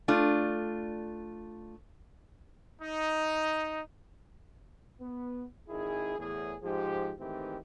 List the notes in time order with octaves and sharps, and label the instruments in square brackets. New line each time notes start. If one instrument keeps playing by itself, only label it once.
[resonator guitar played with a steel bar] A3 D4 F4
[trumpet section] D#4
[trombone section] B3
G#1 D#3 E4 G#4
E2 A2 G#4
G#2 F3 G4
G#2 D#3 E3 A3 C4 G4